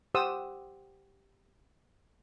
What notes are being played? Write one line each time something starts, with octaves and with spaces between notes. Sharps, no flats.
G4 C5 F#5 D#6 E6